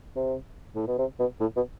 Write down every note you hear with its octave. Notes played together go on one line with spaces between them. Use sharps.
C3
A2
B2
C3
B2
A2
B2